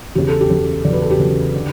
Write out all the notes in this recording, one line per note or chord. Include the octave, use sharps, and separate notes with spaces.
E2 C#3 F#3 G4
A4
G4
E2 C#3 F#3
E2 C#3 F#3 D5
B4
A4
G4
E2 C#3 F#3
D3